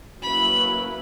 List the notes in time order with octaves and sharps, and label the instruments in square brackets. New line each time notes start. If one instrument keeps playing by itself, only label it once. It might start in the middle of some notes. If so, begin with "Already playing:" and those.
[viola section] F#3 A#3 C#4 E4 B4 [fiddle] B5